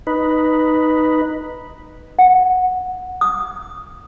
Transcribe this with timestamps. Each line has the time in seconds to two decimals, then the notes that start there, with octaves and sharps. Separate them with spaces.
0.07 D#4 B4
2.19 F#5
3.21 D#6